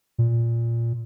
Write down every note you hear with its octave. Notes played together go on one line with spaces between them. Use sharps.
A#2